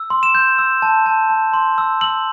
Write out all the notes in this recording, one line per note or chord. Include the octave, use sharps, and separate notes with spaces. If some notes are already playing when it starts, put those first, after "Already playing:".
Already playing: E6
C6
E7
G6
E6
A5
A5
A5
C6
E6
E6 F#7